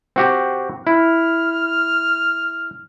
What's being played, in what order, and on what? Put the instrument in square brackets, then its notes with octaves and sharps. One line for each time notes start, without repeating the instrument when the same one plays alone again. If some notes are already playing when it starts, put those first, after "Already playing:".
[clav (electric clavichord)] C4 F#4 G4
[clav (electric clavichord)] E4 [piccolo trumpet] F6